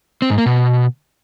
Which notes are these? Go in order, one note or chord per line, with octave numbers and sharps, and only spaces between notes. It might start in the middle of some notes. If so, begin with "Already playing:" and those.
C4
G#2
A#3
B2